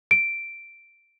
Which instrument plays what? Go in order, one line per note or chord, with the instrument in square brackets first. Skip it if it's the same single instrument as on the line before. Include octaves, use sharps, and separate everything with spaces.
[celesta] D7